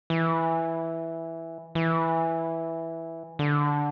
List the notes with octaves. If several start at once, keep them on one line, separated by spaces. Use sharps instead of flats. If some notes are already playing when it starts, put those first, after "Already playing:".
E3
E3
D3